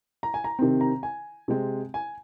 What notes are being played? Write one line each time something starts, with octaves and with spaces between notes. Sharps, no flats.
A#5
G#5
A#5
C3 D#3 C4
A#5
G#5
C3 G#3 C4
G#5